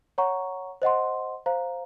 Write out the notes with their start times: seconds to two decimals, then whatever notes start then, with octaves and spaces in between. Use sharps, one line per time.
0.18 C#5 F#5 A#5 C#6
0.82 C5 D#5 F#5 C6
1.46 C5 F5 A#5